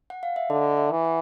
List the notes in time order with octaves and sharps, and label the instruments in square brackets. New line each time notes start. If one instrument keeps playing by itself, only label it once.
[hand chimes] F#5
F5
E5
[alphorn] D3 [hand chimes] D#5
[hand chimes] E5
[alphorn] E3
[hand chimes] F#5